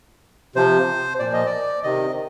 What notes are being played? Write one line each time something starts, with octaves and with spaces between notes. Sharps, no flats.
C3 F3 C5
A#2 F3 D5
D#5
D5
C3 D#3 D#5